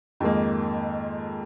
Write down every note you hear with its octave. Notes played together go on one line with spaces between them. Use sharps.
F2 G#2 D#3 G#3 A#3